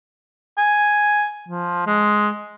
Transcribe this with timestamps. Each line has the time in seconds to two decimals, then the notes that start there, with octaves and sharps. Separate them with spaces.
0.58 G#5
1.48 F3
1.86 G#3